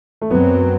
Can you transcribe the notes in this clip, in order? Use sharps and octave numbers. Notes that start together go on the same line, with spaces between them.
A3
F#2 F#3 B3 C4